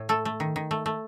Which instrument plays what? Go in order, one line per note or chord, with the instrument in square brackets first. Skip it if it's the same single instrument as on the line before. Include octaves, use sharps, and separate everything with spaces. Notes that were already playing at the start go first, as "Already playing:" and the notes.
Already playing: [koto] A2
A3 A4
A3
D#3
D#3
A3
A3